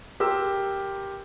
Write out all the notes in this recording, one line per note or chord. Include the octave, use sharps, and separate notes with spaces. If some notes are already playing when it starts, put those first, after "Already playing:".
G4 A#4 C6 E6